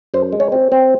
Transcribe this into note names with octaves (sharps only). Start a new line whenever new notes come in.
F#2 C5
G#3
C#5
C4
C4